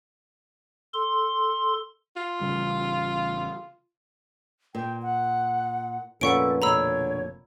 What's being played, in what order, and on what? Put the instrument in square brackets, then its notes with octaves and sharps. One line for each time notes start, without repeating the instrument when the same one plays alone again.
[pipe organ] A4 C6
[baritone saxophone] F4
[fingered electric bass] A1 C#3 G3
[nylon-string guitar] A#2 [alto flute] G5
[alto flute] F#5
[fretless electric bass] F1 A#2 [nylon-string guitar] C#4 B4 [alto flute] A4 [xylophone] F#5 C#6 D7
[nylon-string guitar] B2 D3 [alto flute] C#5 [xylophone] A#5 B5 E6